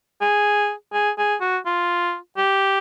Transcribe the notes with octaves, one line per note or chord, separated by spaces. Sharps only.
G#4
G#4
G#4
F#4
F4
G4